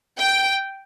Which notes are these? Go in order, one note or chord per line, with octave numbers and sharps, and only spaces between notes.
G5